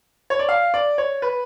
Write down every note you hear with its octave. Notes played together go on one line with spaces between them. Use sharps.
C#5
D5
F5
D5
C#5
B4